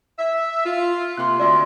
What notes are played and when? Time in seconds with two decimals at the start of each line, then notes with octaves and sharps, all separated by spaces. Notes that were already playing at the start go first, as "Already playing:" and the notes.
0.19 E5
0.66 F4
1.17 C3 A#3 C6 F#6
1.40 D2 D4 D5 E5 C6